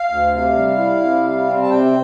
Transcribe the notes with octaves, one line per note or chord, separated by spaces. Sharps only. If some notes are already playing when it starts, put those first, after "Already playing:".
Already playing: F5
D2
C3
G3
E4
C3
G3
C4
A5
C3 G5